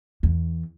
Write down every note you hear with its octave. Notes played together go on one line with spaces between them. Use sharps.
E2